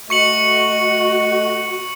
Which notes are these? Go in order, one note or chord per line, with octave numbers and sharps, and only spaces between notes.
A3 F#4 D#5 C#6 C#7 F#7